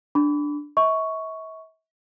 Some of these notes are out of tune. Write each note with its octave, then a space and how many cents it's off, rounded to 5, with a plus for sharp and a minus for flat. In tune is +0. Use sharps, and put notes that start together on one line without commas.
D4 +0 B5 +20 D6 -40
E5 -40 C#6 +5